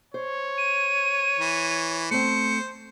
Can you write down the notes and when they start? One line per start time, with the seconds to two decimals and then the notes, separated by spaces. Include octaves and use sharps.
0.14 C5 C#5
0.58 D#7
1.39 E3
2.11 A3 C4 C5 C#7